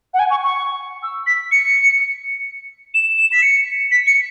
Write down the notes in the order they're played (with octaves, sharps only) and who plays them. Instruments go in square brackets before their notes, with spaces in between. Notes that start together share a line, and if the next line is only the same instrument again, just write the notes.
[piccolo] F#5
G#5
C#6
C#6
E6
B6
C#7
E7
E7
B6
C#7
B6
C#7